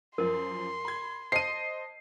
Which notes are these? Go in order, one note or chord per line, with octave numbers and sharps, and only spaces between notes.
F#2 F3 A#4 C6
B5 G#6
C5 D#5 A5 C7 D#7